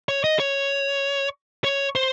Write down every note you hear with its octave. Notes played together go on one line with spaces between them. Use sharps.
C#5
D#5
C#5
C#5
C5